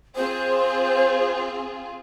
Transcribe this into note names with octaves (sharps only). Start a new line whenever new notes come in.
C4 F4 G#4 C5